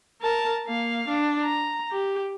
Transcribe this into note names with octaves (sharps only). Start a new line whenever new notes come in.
A#4 A5
A#3 F5
D4
A#5
G4